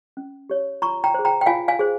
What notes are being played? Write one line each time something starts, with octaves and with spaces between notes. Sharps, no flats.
C#4
G4 C#5
F4 A#5 C#6
G5 A#5
G#4 C5
G5 A#5
G5
F4 F5 G#5
F5 G#5
G#4 C5